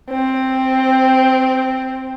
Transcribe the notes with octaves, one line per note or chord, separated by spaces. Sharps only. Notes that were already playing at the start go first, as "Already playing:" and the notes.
C4